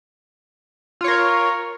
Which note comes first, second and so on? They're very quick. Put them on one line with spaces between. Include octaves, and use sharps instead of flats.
F4 C#5 A#4